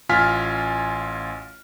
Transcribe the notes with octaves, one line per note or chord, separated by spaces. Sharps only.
A1 F4 G#5 F6 B6